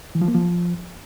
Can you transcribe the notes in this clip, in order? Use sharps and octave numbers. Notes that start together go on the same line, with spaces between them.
E3
F3
A#3
F3